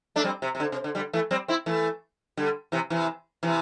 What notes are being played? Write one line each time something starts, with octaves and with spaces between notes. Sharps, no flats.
A3 D4
G3 C4
C3
C3
D3
C3
D3
D3 G3
E3 A3
G3 C4
C4 E4
E3 A3
D3 G3
C3 E3
C3 E3
C3 E3